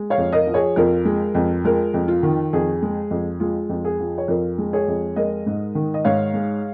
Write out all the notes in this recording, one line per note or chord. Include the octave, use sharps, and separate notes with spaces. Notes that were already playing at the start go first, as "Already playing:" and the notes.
Already playing: G#3
C#5 F5
F2
A#4 D#5
F3
G#4 C#5
F2 F4 A#4
G#3
F2
G#3 F4 A#4
F2
F4
D#3
F2 G#4
G#3
F2
G#3 F4
F2 F4
G#4
F3
C#5
F2 F4 A#4
G#3
G#4 C#5
F2
G#3 A#4 D#5
G#2
D#3
D#5
G#2 C#5 F5
G#3